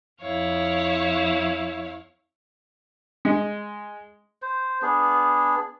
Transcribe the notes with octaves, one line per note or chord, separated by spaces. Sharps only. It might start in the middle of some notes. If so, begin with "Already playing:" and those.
F2 E4 C#5 F5
G#3
C5
B3 D4 G#4